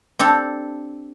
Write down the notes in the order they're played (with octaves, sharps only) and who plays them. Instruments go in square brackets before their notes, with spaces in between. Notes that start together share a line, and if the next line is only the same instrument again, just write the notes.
[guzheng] C4 D4 G4 A4